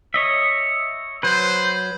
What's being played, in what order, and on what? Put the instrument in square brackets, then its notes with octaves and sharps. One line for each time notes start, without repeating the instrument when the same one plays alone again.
[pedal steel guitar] C#5 D#5 E5
[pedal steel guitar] F#3 B4 [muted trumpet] C5